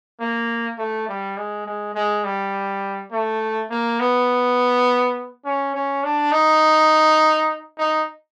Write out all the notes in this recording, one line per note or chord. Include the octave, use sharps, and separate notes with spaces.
A#3
A3
G3
G#3
G#3
G#3
G3
A3
A#3
B3
C#4
C#4
D4
D#4
D#4